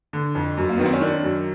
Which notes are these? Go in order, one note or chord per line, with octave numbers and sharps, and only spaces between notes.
D3
F2
F#2
A#3
D#3 B3
C4
C#4
D#3 D4
F#2